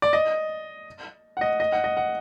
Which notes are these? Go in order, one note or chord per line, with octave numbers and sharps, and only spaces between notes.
D5
D#5
F#5
D#5
D#5
F#5
D#5
F#5